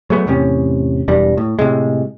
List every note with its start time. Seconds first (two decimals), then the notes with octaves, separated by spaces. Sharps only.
0.10 F#3 G#3 A3 B3
0.26 E2 A2 C3 C#4
1.08 E1 E2 G2 G3
1.37 A2
1.59 A2 C3 G#3